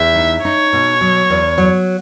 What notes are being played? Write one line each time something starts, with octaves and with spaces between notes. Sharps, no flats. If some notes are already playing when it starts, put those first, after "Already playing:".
Already playing: E2 E5
D#4
D#4 C#5
B2
F#3
E2
F#3